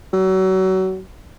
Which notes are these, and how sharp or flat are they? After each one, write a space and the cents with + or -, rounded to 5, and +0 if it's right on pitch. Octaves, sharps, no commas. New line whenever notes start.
F#3 +30